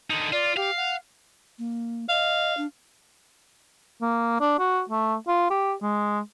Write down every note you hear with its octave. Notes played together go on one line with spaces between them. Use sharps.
D3 D#4
F4 D5
G4 F5
F#5
A#3
D#5 F5
D4
A#3
D4
F#4
A3
F4
G4
G#3